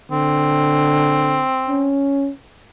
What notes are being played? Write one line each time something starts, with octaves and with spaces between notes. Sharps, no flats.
D3 C4
C#4